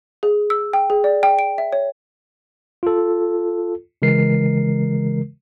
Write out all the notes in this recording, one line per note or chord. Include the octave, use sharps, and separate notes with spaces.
G#4
E6
G5
G#4
D5
G5
D7
E5
C#5
F4 A4
C#3 E3 G#3 A#4 C7